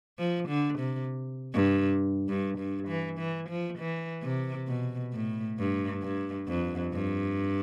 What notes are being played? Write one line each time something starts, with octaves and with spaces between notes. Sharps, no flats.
F3
D3
C3
G2
G2
G2
E3
E3
F3
E3
C3
B2
A2
G2
G2
F2
G2